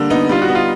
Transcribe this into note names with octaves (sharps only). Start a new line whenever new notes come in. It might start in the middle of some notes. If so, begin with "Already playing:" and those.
Already playing: D3 G3 A#3
B3 D#4
G3 F4
F#4
B3
F4